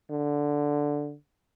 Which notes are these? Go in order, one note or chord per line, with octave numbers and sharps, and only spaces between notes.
D3